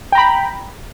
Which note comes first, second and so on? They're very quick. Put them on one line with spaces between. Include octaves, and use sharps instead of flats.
G5 A#5 B5